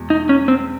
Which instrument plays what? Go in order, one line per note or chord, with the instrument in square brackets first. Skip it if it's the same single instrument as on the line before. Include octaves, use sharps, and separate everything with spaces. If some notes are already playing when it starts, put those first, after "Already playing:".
Already playing: [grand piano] E2 B2 G#3
[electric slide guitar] D#4
C#4
C4